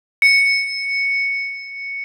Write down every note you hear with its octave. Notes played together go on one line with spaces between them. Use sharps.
C#7